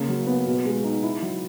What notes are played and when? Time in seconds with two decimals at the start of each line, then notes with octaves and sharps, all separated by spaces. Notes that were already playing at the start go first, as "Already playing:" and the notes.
Already playing: C#3 A#3
0.09 F#3
0.27 B3
0.47 B2
0.65 G#3
0.84 D#4
1.03 E4
1.22 F#3